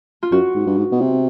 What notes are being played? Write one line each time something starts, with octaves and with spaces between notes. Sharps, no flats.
F4
F#2 F#4
G#2
G2
G#2
B2
C3